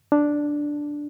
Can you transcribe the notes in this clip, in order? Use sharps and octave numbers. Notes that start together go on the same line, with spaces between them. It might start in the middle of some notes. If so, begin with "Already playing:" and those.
D4